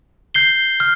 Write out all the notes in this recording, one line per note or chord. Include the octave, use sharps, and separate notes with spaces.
G6 C7 G7
F6